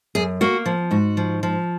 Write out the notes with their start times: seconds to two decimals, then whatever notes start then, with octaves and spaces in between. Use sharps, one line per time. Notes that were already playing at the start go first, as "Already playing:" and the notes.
0.15 F#2 G#4
0.41 A#3 F#4
0.66 F3
0.91 G#2 F#4
1.17 F3
1.43 F3